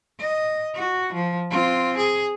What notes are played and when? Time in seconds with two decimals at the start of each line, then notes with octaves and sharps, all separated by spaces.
0.20 D#5
0.75 F#4
1.13 F3
1.50 C4 F4
1.97 G#4